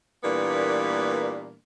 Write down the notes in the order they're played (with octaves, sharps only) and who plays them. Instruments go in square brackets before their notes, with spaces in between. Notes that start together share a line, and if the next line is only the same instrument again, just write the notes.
[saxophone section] A#2 E3 G3 A#3 B3 D4